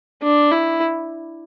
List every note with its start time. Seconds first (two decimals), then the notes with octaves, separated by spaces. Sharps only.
0.23 D4
0.52 E4